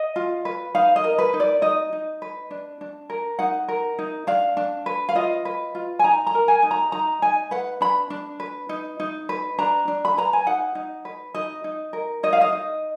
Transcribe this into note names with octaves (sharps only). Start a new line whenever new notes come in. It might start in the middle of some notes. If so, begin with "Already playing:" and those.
Already playing: D#5
F4
B4
D#4 F5
D#5
A#4
B4
D#4
D5
D#4 D#5
D#4
B4
D4
D4
A#4
D#4 F#5
A#4
D#4
D4 F5
D4
B4
F5
F4 D#5
B4
F4
G#5
D#4 A#5
A#5
A#4
G#5
D#4 G#5
A#5
D#4 A#5
D#4 G#5
B4 F#5
D4 B5
D4
B4
D#4
D#4
B4
D4 A#5
D4
B5
B4 A#5
G#5
D#4 F#5
D#4
B4
D#4 D#5
D#4
A#4
D#4 D#5
F5
D#5
D#4